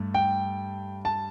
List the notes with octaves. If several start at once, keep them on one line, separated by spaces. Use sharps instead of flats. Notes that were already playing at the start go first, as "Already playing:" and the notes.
Already playing: G2 A3
G5
A5